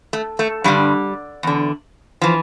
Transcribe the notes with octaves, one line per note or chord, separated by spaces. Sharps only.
A3
A3
G2 D3 G3
E2 D3
E3 F3